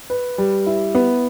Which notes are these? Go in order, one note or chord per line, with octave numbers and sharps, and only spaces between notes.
B4
G3
E4
B3